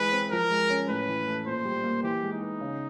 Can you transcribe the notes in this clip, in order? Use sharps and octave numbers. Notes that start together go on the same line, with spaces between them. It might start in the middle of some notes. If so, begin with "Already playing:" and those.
Already playing: E3 G#3 B4
C4
F3 A#4
G#3
C#4
A2 B4
E3
A3
A#2 C5
G3
A#3
E3 G4
G#3
D#4
B3
C#3